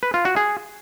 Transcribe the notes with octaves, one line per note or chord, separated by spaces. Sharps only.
B4
F4
F#4
G#4